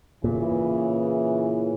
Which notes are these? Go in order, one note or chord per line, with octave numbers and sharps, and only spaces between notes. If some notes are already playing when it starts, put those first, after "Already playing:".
A#2 C#3 E3